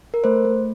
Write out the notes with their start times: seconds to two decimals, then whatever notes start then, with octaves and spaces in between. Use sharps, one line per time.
0.14 A#4
0.24 A3 C5
0.45 A3